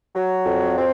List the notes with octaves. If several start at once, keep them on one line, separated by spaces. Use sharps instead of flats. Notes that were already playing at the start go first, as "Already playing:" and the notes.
F#3
F2
C4